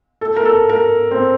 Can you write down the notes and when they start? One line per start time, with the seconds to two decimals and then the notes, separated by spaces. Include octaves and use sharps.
0.21 A4
0.36 A#4
0.45 A4
0.69 A#4
1.11 C4